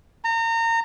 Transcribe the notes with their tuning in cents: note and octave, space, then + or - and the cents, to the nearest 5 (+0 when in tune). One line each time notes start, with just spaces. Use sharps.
A#5 -30